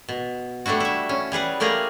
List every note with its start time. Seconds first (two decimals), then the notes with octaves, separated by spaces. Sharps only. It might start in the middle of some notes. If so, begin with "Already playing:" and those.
0.09 B2
0.66 G3 A3 D4 E4 F#4
0.80 E4 E5
1.09 C#4
1.32 G3 G#4 B4 F#5
1.60 A3 A#3 G4 G#4 A#5